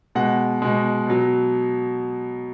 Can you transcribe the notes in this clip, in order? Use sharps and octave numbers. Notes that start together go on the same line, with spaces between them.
B2 G#3 F#5
B2 G#3
B2 F#3